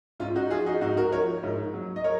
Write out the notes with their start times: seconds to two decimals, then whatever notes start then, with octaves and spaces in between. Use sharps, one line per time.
0.20 G#2 C#4 F4
0.36 D#4 F#4
0.50 F3 F4 G#4
0.66 D#4 F#4
0.81 G#2 D#4 F#4
0.97 F#4 A#4
1.12 F3 A#4 C#5
1.43 G#2
1.74 F#3
1.96 D#5
2.04 A#4 C#5